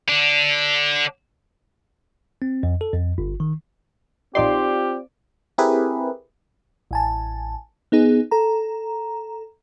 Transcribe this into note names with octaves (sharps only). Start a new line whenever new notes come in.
D3 D4
C4
F2
A4
F2
G1
D#3
A#1 C4 D#4 F4 G4 D5 C6
C4 E4 G4 G#4 A#4 B4
A1 G#5 A5
B3 D#4 G#4
A4 A#5